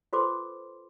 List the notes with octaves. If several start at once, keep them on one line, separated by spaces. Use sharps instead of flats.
F4 A4 B4 C5 C6 D6